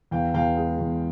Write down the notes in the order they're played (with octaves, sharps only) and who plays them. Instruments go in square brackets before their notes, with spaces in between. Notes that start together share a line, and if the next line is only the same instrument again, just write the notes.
[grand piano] E2 F5 G5
E2 F5 G5
G#3
E2